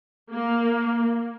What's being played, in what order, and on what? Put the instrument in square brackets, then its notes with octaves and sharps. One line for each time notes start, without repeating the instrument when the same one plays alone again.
[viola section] A#3